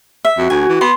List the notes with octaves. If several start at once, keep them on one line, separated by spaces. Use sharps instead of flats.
E5
F2 F#4
D2 G#5
E3
B3 C6